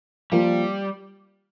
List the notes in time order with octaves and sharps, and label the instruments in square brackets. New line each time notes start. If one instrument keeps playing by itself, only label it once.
[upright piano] F3 A#3 F4 A#4 [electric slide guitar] G3